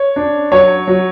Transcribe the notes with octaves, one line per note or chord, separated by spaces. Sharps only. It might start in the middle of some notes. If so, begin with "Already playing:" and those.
Already playing: C#5
D4
F#3 C#5
F#3